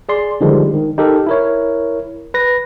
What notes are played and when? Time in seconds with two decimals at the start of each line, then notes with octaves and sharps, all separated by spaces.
0.09 G#4 D5 C6
0.41 D3 D#3 F3 G3 G#3
0.74 D#3
0.98 D#4 G4 A4 A#4
1.27 E4 A#4 C#5
2.34 B4 A#6